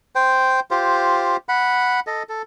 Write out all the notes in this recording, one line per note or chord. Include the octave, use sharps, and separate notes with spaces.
C5 G5
F4 G4 C5
F#5 B5
A4 D#5
A4